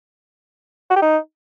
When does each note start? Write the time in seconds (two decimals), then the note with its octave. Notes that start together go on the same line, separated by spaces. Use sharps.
0.90 F#4
0.96 G4
1.02 D#4